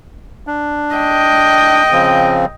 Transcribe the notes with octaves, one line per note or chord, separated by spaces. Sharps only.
D4
D#5 G5
C#3 F3 C4